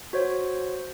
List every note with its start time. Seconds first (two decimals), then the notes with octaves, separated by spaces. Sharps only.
0.13 F#4 C5 C#5